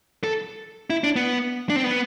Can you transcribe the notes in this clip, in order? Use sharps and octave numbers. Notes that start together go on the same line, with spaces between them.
A4
E4
D4
B3
D4
C4
B3